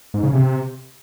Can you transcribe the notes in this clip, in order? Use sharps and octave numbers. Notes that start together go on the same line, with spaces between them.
G#2
C#3
C3